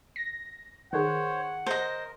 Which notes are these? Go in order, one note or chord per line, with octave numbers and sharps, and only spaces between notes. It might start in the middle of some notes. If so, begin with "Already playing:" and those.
A#6
D#3 G#4 C5 C#5 F#5
A#4 C5 D#5